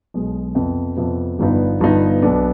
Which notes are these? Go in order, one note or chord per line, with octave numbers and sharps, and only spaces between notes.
B1 B2 G#3
F2 C3 F3 B3
F2 C3 F3 B3
G1 G2 F3 B3 D#4
G1 G2 F3 B3 D#4
B1 B2 B3 D4